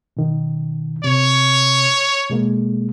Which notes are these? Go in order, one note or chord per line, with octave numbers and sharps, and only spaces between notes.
B2 D#3
C3 C#5
B2 G#3 A#3